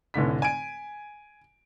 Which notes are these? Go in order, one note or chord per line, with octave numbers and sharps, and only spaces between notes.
F1 A2 D3 B6
G#5 D7